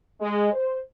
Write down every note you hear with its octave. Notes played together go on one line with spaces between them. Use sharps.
G#3
C5